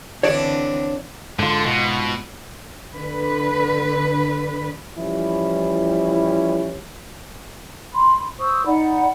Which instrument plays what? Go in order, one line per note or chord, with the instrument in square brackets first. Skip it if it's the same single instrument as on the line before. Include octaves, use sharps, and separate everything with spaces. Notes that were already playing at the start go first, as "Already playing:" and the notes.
[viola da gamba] D3 E3 C4 [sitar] D4 [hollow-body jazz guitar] C#5 D5
[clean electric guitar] G#2 F4 [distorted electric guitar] D3
[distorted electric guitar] B2
[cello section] D3 B4
[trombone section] E3 F3 G3 C#4 E4
[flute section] B5 C6
C5 C#6 D#6 E6
D#4 D5 F#5 B5